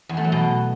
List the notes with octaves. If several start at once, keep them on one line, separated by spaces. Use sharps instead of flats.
E2
A3
F#3
B2